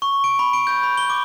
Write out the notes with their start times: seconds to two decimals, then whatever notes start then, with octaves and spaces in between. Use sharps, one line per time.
0.02 C#6
0.24 D7
0.39 B5
0.53 D7
0.67 G6
0.83 B5
0.97 G7
1.10 D6